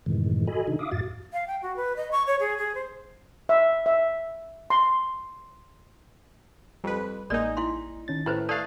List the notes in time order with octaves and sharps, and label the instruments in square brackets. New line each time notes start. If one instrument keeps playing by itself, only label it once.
[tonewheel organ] F#2 A2 C3 D#3 E3 G#3
F#4 A4 D#5 G#5 B5
C3 D#3 D4 D#4
E5 F5 D6 D#6
F#2 A2 F#4 F5 A6
[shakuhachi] F5
G5
F#4
B4
D#5
C#6
C#5
G#4
G#4
C5
[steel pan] E5
E5
C6
[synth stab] F2 B4 [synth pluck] G3
[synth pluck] A1 A#3 G#5 [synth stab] G#3 D#4 [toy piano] D5
[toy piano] E4 F5 C6
[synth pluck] D#3 C#4 A6
[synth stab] A2 [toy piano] E4 B4 C5
[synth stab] A3 F5 [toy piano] D5 [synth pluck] D#6 F#6 A6